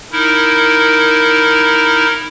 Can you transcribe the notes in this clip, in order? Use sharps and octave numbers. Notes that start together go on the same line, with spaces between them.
D#4 E4 A#4